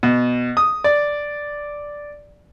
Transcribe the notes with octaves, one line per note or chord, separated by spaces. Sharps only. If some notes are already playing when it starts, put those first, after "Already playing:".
B2
D#6
D5